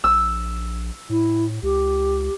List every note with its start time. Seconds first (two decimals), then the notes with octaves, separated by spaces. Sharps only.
0.04 A#1 E6
1.10 A2 E4
1.63 C#2 G4